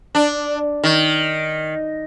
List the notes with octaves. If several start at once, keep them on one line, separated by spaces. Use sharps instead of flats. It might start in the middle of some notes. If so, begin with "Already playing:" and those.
D4
D#3